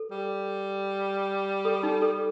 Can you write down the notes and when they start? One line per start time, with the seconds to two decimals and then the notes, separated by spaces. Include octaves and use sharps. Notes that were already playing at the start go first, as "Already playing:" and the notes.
Already playing: A4
0.11 G3
1.65 A4
1.83 D#4
2.02 A4